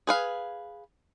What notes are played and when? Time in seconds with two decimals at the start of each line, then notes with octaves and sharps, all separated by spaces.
0.07 G#4 B4 F5